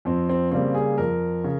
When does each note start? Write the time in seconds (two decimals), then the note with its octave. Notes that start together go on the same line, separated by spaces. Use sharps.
0.05 F2 C4
0.29 C4
0.51 C#3 G3 A#3 C4
0.75 G#4
0.98 F2 A#4
1.44 C#3